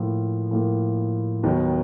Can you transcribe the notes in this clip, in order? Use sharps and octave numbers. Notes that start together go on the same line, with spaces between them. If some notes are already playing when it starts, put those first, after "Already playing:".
Already playing: A2 F3 A#3
A2 F3 A#3
D#2 D#3 F#3 B3 D#4